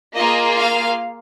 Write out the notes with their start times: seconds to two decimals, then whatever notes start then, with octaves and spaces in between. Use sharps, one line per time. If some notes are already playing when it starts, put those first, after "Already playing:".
0.16 A#3 F4 G#4 D#5
0.60 F5